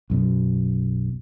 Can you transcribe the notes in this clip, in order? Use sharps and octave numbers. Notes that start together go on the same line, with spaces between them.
B1 F#2 B2